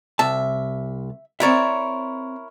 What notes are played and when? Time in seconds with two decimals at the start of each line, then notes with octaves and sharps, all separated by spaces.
0.19 C2 E5 A5
1.40 C4 E4 A#4 C#5 D5 E5